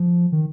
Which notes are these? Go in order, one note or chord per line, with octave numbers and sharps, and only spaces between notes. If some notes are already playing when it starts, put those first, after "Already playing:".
Already playing: F3
D#3